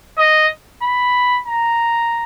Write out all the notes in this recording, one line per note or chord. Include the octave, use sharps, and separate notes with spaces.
D#5
B5
A#5